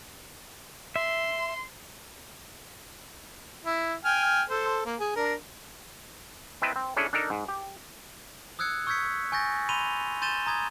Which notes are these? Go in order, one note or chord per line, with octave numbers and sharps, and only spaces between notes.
E5 C6
E4
G5 G#5 F6
A4 C5
A#3
G#4
D4 A#4
C4 E4 B4 D#5 A5
C4
C#4 D4 E4 G#4 A4
D4 D#4 A4 A#4
G#2
G4
D#6 E6 F#6 G#6 C#7
C#6 E6 G6 G#6 B6 C#7
G#5 C#6 G6 A6 A#6
B5 C6 D#7 F7 G7
C6 G6 A6 D#7 E7 G7
A#5 D#6 G#6